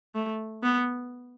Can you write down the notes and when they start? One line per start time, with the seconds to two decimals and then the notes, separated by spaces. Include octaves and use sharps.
0.15 A3
0.63 B3